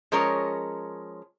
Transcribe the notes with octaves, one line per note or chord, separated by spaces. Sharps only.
F3 G#3 C#4 A#4 C#5